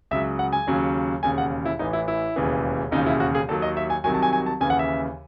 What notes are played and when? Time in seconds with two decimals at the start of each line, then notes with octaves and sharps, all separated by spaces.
0.11 C#2 C#3 F#3 E5
0.39 F#5
0.53 G#5
0.67 D#2 C#3 F#3
1.23 E1 D#2 C#3 G#5
1.38 F#5
1.65 E4
1.79 A1 A2 E3 D#4
1.93 E4
2.08 E4
2.36 E1 D#2 C#3 E3
2.91 E1 D#2 C#3 D#4
3.06 E4
3.20 F#4
3.35 G#4
3.48 D#2 D#3 F#3 A4
3.62 D#5
3.77 E5
3.90 G#5
4.04 C2 C3 D#3 F#3 G#5
4.14 A5
4.22 G#5
4.33 G#5
4.46 A5
4.60 D#2 C#3 E3 G#5
4.70 F#5
4.79 E5